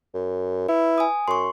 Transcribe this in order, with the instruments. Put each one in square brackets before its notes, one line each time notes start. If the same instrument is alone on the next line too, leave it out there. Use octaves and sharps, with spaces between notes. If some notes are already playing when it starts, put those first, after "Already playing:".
[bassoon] F#2
[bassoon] E4 [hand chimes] B4
[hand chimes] G#5 D#6
[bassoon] F#2 [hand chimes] C6 C#6